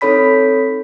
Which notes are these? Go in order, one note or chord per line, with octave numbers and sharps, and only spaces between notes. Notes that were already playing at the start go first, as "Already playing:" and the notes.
C4 D#4 A4 C#5 B5 B6